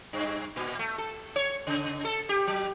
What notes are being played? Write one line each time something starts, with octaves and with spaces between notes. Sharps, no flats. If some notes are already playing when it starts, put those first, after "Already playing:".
G2
A#2
A3
A4
C#5
C#3
A4
G4
F#3